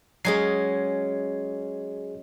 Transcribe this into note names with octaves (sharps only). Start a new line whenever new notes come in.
F#3 G#3 C#4 G#4 C7